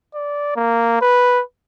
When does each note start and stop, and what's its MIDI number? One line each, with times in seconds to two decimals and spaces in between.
0.14 0.55 74
0.56 0.99 58
1.01 1.42 71